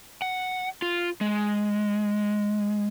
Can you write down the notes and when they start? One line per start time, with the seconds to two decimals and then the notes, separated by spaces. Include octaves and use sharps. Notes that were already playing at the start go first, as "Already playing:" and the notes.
0.22 F#5
0.82 F4
1.21 G#3